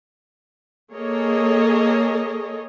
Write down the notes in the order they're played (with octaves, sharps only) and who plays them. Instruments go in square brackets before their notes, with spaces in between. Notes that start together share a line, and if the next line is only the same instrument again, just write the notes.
[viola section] A#3 G#4 A4 C#5 D#5